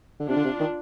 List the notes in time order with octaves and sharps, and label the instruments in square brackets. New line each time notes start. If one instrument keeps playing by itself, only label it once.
[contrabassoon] D3
[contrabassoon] C3 [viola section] D4 F4
[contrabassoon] D3
C3
D#3